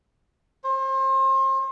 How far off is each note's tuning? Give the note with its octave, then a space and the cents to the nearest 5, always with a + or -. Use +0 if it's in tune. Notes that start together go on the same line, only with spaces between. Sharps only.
C5 +35